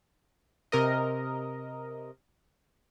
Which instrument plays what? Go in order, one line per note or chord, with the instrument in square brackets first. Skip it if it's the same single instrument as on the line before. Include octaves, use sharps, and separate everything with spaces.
[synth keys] C3 A#4 D#5